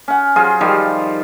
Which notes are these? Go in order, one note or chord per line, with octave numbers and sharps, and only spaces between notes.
C#4 F#5
F#3 F4 G#4 C5
D#3 F3 G3 F5